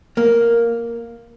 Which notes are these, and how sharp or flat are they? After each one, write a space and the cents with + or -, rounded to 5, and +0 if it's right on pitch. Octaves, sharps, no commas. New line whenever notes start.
A#3 +0